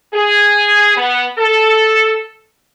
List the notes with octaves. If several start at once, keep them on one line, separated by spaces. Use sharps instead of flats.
G#4
B3
A4